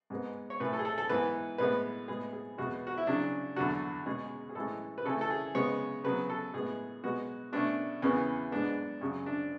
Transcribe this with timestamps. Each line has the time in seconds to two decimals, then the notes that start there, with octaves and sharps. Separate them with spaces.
0.10 G#2 G#3 B3
0.50 C#5
0.60 A2 E3 A3 B4
0.73 A4
0.79 G#4
0.85 A4
0.98 A4
1.09 G#2 E3 B3 B4
1.58 A2 G#3 B3 B4
2.08 A2 G#3 B3 G#4
2.33 G#4
2.58 E2 B2 G#3 B3 F#4
2.87 F#4
2.98 E4
3.07 C#3 F#3 C#4 D4
3.56 E2 D3 F#3 F#4
4.06 B2 G#3 C#4 G#4
4.49 G#4
4.55 A2 E3 G#3 C#4 A4
4.98 B4
5.05 C#3 E3 A3 C#4 A4
5.21 A4
5.30 G#4
5.55 C#3 G#3 B3 C#5
6.04 C#3 F#3 B3 B4
6.30 A4
6.53 A2 G#3 B3 G#4
7.04 B2 G#3 B3 F#4
7.53 B2 A3 C#4 D4
8.02 E2 C#3 E3 B3 C#4
8.51 G#2 G#3 B3 D4
9.01 F#2 C#3 F#3 C#4
9.26 D4